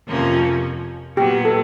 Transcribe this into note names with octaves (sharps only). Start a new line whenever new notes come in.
F2 C3 F3 A#3 C#4
A#2 F#3 B3 G4
A4